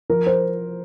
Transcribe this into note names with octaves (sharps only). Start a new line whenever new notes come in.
F3 A#4
C5